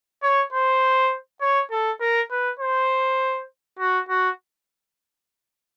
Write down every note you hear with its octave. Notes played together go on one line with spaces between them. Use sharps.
C#5
C5
C#5
A4
A#4
B4
C5
F#4
F#4